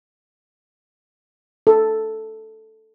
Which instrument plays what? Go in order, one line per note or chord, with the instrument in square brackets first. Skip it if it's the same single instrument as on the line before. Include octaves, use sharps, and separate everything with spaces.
[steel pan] A4